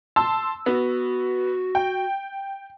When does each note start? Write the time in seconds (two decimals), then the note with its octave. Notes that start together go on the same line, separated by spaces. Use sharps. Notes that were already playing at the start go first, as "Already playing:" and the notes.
0.16 A5 C6 E6
0.66 B3 F#4
1.75 G5